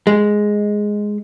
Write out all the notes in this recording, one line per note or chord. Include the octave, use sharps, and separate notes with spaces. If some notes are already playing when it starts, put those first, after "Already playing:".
G#3